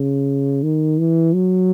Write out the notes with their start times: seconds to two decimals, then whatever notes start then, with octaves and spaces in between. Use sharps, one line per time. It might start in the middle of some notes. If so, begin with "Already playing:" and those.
Already playing: C#3
0.63 D#3
0.99 E3
1.34 F#3